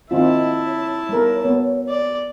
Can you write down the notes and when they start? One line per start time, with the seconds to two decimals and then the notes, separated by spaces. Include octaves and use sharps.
0.11 D#3 C4 E4 F4 D#5 A5
0.67 C#5
1.09 G3 B3 A#4
1.45 B3
1.89 D5